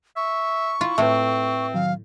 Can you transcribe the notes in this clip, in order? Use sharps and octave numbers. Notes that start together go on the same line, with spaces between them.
E5 C#6
E4 F4
A2 A3 C4 B4 E5
D#3 F#3 F5